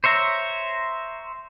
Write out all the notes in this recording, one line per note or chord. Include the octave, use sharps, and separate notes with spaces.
C5 C#5 E5 A#5